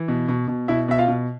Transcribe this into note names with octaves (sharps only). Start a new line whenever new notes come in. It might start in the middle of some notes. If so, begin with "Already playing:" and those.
Already playing: E3
B2
B2
B2
B2 E4 E5
B2 E5
F4 F5
B2